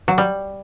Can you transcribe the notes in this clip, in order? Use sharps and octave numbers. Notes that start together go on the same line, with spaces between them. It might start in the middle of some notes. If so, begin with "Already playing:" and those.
F#3
G3